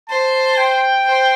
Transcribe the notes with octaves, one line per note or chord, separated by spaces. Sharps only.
C5 A5
G5
C5